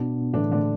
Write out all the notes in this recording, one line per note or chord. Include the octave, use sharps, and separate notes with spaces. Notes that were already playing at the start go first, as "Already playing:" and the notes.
Already playing: B2 B3 D4
A2 D3 E3 A3 D4
D3 D4